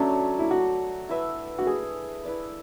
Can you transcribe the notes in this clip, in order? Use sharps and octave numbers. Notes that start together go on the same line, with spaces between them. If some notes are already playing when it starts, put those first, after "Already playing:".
Already playing: F#3 A3 C#4 D4
E4
F#4
E4 B4 E5
F#4
G#4
E4 B4 D5